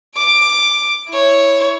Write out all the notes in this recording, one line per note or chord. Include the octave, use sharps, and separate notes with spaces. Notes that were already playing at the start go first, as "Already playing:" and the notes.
D6 D7
E4 C#5